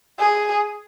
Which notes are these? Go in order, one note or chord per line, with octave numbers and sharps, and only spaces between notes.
G#4